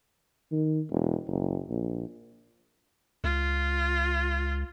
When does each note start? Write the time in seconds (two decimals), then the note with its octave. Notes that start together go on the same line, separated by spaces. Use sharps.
0.52 D#3
0.91 E1
1.27 F#1
1.69 A#1
3.24 C#2 F4